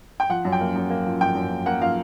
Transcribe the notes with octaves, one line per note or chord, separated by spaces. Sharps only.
G5
F3 F#5
F#2
G5
A#3
F#2
A#3
F3
F3 G5
F#2
A#3
A#3 F#5
F3 F5